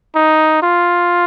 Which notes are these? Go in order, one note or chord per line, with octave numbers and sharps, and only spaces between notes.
D#4
F4